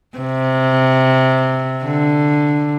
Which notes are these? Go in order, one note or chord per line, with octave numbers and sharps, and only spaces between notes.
C3
D3